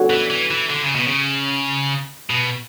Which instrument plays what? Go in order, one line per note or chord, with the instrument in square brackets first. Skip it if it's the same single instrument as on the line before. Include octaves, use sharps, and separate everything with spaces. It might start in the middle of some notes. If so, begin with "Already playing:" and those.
Already playing: [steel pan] D4 F#4 A4 C#5 F#5
[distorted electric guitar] E3
E3
E3
D3
C#3
B2
C#3
B2